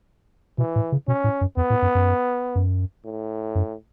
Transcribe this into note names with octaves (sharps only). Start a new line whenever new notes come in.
B2 E3
A2
C#3
B2 C#4
A2
F#2
E2 B3
A2
F#2
F#2
F#2
A2
F#2